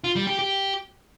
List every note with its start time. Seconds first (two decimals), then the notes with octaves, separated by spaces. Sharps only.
0.04 F4
0.16 G3
0.27 G4
0.39 G4